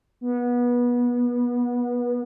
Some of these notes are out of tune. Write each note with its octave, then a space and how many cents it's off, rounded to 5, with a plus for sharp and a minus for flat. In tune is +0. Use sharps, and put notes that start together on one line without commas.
B3 -25